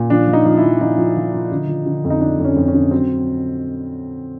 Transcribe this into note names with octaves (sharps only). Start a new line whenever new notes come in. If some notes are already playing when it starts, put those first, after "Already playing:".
Already playing: A#2
F3 D4
F3
D#4
F3
E4
F3
F3 D#4
F3
F3
F3
D3
F3
D3
F2
D#4
F3 D4
F2
C#4
F2 C4
C#4
D3
F#3 C4